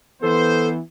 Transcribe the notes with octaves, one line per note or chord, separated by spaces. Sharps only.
E3 B3 A4 C5